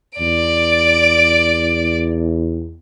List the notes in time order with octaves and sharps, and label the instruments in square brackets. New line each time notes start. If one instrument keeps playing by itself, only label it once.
[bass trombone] E2 [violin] D5 D7